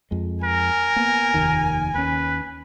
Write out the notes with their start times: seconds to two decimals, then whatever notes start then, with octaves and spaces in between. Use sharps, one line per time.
0.11 F2 G#3
0.44 A#4 G#5
0.96 A#3 B3
1.34 F1 D#2 D#3
1.95 D#2 C#4 B4